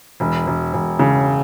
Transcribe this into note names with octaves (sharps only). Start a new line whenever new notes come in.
E1
E1
E1
C#3